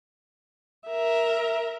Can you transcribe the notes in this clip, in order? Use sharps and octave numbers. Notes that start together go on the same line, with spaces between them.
A#4 E5